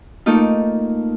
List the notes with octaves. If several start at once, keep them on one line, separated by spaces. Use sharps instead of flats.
A3 A#3 D#4 F4